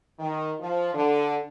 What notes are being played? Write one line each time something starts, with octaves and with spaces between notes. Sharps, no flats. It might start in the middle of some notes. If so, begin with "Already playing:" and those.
D#3
F3
D3